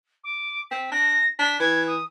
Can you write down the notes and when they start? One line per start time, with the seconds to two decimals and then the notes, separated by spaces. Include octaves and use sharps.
0.24 D6
0.71 C4 B6
0.91 D4 A#6
1.39 D4 B6
1.60 E3 G#6
1.87 D#6